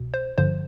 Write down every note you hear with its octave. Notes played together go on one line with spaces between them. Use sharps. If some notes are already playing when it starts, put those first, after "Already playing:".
Already playing: C2 B2
C5
G1 G2 D3 F3 C5